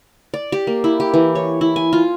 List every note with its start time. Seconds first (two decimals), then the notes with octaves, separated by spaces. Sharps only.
0.34 D5
0.52 G4
0.67 A#3
0.84 E4
1.00 G4
1.14 E3
1.35 C#5
1.61 E4
1.76 G#5
1.93 F4